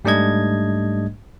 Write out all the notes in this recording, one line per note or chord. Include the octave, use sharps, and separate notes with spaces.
G#2 G3 A3 D4 D#5 G#6